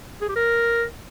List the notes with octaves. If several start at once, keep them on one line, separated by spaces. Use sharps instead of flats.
G#4
G4
A#4